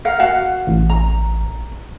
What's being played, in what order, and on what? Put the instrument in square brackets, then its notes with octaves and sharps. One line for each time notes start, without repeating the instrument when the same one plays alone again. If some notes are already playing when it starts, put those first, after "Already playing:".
[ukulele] A#4 F5 F#5
F#4 F5 F#5
[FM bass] A1
[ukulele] A#5